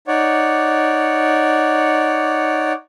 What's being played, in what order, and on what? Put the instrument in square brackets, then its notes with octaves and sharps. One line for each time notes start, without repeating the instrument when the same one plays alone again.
[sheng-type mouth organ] D#4 C#5 D5 F#5